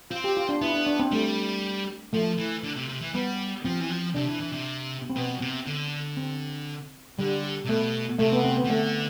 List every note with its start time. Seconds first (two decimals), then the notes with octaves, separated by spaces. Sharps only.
0.11 C4 F4
0.24 G4
0.37 F4
0.49 D4
0.62 B3 E4
0.74 D4
0.86 D4
1.00 C4
1.12 G3 A3
2.13 F3 A3
2.38 E3
2.64 D3
2.77 C3
2.89 C3
3.02 E3
3.14 G3 B3
3.65 F3 C4
3.80 E3
3.90 F3
4.15 C3 D4
4.28 E3
4.40 E3
4.53 C3
5.10 C4
5.16 B2 B3
5.42 C3
5.66 D3
6.17 C4
7.18 D3 G3
7.65 C3
7.69 B2 A3
8.19 C3 A3
8.32 B3
8.44 C4
8.57 B3
8.65 E3
8.70 D3 A3